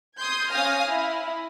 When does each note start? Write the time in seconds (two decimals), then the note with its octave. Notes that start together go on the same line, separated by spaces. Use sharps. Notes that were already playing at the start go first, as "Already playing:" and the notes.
0.19 C6 D#6 G6 G#6
0.51 C#4 F5 G#5 D#6 F6 A#6
0.89 E4